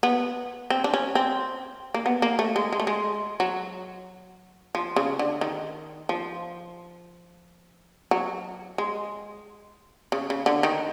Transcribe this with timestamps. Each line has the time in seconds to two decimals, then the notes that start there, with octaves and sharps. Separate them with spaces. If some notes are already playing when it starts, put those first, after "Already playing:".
0.03 B3
0.70 C4
0.84 D4
0.94 C#4
1.15 C4
1.94 A#3
2.06 B3
2.22 A#3
2.39 A3
2.56 G#3
2.73 G#3
2.80 A3
2.87 G#3
3.40 F#3
4.75 F3
4.96 C#3
5.19 D3
5.41 D#3
6.09 F3
8.11 F#3
8.78 G#3
10.12 C#3
10.30 C#3
10.46 D3
10.63 D#3